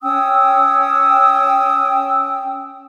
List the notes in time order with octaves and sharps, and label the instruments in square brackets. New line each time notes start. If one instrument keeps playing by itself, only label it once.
[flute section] C#4 G5 D#6 E6